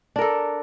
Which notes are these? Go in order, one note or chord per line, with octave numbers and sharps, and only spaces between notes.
D4 A4 A#4